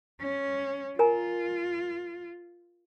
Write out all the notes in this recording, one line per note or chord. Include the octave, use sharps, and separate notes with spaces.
C#4
F4 A#4 G#5 A#5